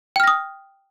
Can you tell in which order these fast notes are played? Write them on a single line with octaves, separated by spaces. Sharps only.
G5 F6 A#6 D#6